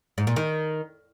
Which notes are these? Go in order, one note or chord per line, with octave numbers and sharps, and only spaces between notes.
G#2
A#2
D#3